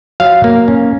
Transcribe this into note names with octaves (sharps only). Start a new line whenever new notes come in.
F#3 F5
A#3
C#4